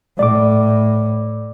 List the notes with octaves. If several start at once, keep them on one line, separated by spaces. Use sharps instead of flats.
A2 D5 D6